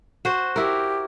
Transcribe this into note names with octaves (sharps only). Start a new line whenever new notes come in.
F#4 C5
E4 G4 A#4